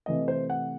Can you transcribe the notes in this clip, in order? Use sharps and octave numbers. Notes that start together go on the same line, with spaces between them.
C3 E3 A3 D#5
C5
F#5